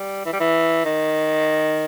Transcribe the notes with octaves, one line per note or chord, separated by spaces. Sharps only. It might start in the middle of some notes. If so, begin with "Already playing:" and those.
Already playing: G3
E3
G3
E3
D#3